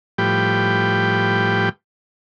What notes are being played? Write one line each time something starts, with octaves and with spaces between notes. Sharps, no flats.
A2 F3 G3 G4 B4 G5